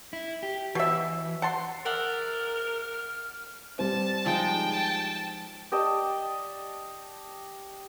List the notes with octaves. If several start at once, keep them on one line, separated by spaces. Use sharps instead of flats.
E4
G4
B2 E3 E5
F#5 A5 C6
A#4 D5 E5 F#5 F6
G3 C4 A5
F3 G#3 D#4 G5
A5
G4 D5 D#5 A5